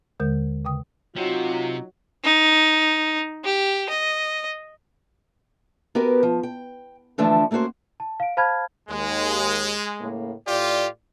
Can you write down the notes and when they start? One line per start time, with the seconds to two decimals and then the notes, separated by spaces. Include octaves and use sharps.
0.20 D#2 D3 G#3 A#4 G6
0.65 C#3 G5 D#6
1.16 C3 F#3 D#4 F4 F#4
2.24 D#4
3.44 G4
3.89 D#5
5.95 B3 F#4 G4 A#4 B4
6.23 F3
6.43 G5
7.18 D3 E3 F3 A3 D4
7.51 A3 A#3 C#4 F#4 C5
8.00 A5
8.20 F5 D7
8.37 C5 F5 A5 B5 F6 G#6
8.89 D#2 G#3
10.00 A2 C#3 A#3
10.47 A2 F4 G4 D5